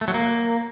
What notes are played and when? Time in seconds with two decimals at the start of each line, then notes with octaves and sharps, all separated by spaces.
0.01 A3
0.08 F#3
0.14 A#3